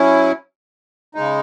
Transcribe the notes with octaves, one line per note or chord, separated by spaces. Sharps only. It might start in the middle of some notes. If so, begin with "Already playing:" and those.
Already playing: F#3 C#4 E4
C#3 G#3 D#4